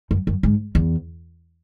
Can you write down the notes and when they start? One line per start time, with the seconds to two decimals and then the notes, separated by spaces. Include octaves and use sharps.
0.11 F#2
0.27 F#2
0.43 G#2
0.75 E2